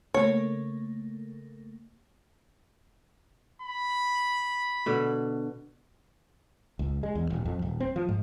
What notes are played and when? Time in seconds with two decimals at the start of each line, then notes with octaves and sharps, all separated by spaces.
0.14 C#3 A3 A#3 C#5
3.62 B5
4.86 B2 D3
6.79 C#2
7.03 G#3
7.15 E2
7.30 D#1
7.45 F2
7.62 D#1
7.80 C4
7.96 F3
8.09 G#2